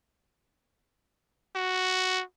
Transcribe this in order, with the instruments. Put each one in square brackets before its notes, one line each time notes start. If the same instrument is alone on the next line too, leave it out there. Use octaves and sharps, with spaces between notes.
[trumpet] F#4